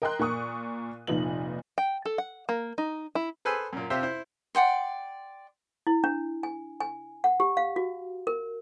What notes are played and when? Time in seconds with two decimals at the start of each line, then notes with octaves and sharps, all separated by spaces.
0.02 A#4 D#5 G5 A#5 C6 F#6
0.19 A#2 A#4 C#6 D#6
1.07 F1 A#2 F3 D#4 B4 F#7
1.78 G5
2.05 A4
2.18 F#5
2.49 A#3
2.78 D#4
3.15 E4
3.45 G#4 A4 B4 C5 G#5 E6
3.73 F#2 A#2
3.90 C3 F4 G4 C5 E5
4.03 E4 C5
4.55 D5 F#5 G5 C6
5.87 E4
6.04 D4
6.43 G#5
6.80 G#5
7.24 F#5
7.40 G4
7.57 F5
7.76 F#4
8.27 A#4